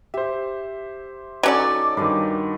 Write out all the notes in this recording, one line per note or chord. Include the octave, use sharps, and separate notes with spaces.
G4 C5 E5
F#3 C#4 D#4 F#4 A4 D5 D6
G2 D#3 C5 G#5